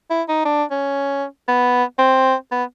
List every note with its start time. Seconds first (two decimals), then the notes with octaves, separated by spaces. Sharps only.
0.10 E4
0.28 D#4
0.45 D4
0.71 C#4
1.48 B3
1.99 C4
2.51 B3